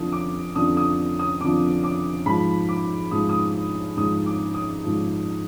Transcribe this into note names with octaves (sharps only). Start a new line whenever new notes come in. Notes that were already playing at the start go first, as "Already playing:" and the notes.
Already playing: F2 D3 F3 D#6
D6
F2 D3 F3 D#6
D#6
D#6
F2 D3 F3 D6
D6
G#2 F3 B5
D6
G#2 F3 D#6
D#6
G#2 F3 D#6
D6
D#6
G#2 F3